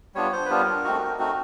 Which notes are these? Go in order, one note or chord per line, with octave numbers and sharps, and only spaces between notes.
G3 B3 D4 F4 C#5
C5
B4
G3 B3 D4 F4 A#4
A3 C4 D#4 F#4
A3 C4 D#4 F#4